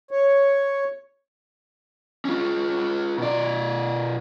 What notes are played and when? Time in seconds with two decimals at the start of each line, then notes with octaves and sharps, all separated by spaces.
0.11 C#5
2.25 C#4 F4
3.18 B2 D5